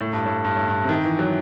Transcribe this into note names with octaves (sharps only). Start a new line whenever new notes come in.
A2
G2
A2
G2
A2
G2
C3
D#3
E3
F#3